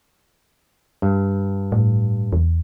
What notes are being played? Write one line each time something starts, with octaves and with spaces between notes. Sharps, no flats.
G2
A2
E2